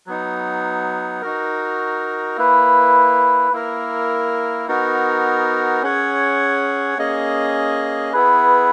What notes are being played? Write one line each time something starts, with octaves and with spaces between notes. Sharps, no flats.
F#3 B3 D#4
D#4 F#4 A#4
A#3 E4 B4
A#3 E4 A#4
B3 D#4 F#4 A#4
C#4 G#4 C#5 F#5
A#3 C#4 G#4 D#5
B3 E4 G#4 B4